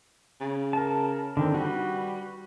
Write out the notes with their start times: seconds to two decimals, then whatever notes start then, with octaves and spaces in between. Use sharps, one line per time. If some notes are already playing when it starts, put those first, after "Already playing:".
0.41 C#3
0.73 A#4 A5
1.37 D3 D#3 C4
1.54 G3 F#4 B4